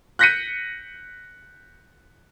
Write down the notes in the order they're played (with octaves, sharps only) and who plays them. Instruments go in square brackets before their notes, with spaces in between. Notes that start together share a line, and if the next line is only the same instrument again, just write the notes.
[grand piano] F#6 G6 A#6 B6 C#7 D#7